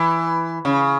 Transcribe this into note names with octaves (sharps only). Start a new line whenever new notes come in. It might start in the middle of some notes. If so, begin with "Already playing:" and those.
Already playing: E3
C#3